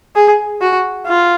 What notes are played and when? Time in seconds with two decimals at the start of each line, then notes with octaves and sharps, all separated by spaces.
0.16 G#4
0.61 F#4
1.07 F4